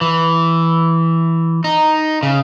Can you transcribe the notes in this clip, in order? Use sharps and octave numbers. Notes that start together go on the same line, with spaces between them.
E3
D#4
C#3